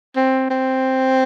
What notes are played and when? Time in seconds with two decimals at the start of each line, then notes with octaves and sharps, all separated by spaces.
0.16 C4
0.50 C4